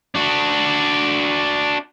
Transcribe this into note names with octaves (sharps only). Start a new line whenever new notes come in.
D4 F#4